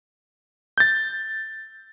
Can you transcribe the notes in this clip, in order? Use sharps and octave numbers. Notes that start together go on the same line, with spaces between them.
G6 A6